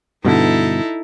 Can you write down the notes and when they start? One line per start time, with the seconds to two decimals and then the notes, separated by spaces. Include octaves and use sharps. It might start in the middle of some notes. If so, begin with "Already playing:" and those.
0.25 G2 B2 D3 D#4 E4 A4